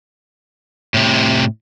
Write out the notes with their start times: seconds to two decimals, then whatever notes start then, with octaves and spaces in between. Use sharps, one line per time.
0.94 A2 C3